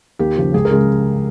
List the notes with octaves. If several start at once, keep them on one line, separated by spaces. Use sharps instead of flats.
D#2 G4
C#3 F3
C#2 G#4
A#4
C#3 G#3